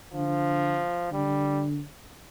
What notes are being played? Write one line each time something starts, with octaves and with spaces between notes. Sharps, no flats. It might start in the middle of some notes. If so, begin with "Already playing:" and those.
D3 F3
D3 G3